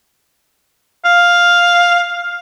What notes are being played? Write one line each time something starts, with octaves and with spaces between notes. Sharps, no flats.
F5